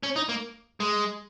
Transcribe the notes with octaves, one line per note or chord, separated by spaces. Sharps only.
C#4
D#4
A#3
G#3